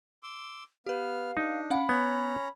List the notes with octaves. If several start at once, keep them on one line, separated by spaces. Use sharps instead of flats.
C6 D6 E6
B3 G4 B4 F5 F6
D4 D#4
C#4 F5 F#5 B5
B3 C#4 C#5 A#5 G#6